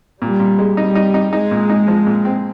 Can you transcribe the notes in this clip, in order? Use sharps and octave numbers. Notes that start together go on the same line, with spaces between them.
A#2 G3
A#2
G#3
G3 D#4
D#4
D#4
G#3 D#4
A#2
D#4
F3
A#2
C4